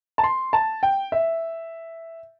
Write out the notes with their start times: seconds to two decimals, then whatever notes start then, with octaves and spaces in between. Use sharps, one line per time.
0.18 A5
0.24 C6
0.53 A5
0.83 G5
1.12 E5